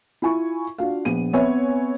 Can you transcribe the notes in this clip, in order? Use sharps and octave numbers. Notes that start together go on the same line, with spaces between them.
E4 F4 G#5 C#6
D4 F4 F#4 F5
A#1 B3 D#7
B3 C4 B4 C#5 E5 G#5